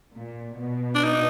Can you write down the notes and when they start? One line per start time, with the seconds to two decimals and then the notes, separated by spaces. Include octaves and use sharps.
0.14 A#2
0.59 B2
0.95 D4
1.04 D#4